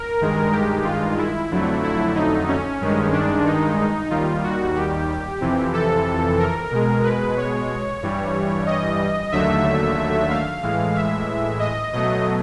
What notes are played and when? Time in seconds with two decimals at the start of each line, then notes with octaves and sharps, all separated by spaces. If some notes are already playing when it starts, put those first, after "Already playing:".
Already playing: A#4
0.21 G2 D#3 G#3
0.52 G4
0.85 F4
1.18 E4
1.51 F2 D3 F#3 A3
1.83 E4
2.15 D#4
2.48 C#4
2.81 G2 D#3 G#3
3.13 D4
3.46 D#4
4.10 D#2 D#3 G3 F4
4.44 F#4
4.76 G4
5.41 F2 C3 E3
5.74 A4
6.39 A#4
6.71 B2 G#3
7.04 B4
7.37 C#5
8.03 G2 E3 G3
8.66 D#5
9.32 D#2 D3 F#3 A3 E5
10.31 F5
10.63 A2 E3 G#3
10.95 E5
11.60 D#5
11.93 B2 F#3 A3 D#5